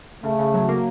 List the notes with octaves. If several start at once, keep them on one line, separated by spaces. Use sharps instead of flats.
C#3 A3
C#3
F#3
A#3